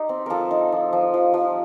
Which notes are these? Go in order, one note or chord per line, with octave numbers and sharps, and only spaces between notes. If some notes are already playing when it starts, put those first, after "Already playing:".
Already playing: D#4 G4
C4
F3 A4 A#4
D#4
F3
F3
F3
F3